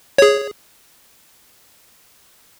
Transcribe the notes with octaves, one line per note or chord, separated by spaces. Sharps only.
G#4 C#5